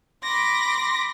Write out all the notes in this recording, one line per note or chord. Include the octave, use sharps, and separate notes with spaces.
B5 C6 D6 A#6